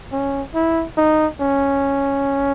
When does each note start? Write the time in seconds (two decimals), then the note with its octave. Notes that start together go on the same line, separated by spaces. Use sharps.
0.12 C#4
0.55 E4
0.98 D#4
1.41 C#4